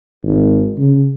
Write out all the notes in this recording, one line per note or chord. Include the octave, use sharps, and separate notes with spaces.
G#1
C#3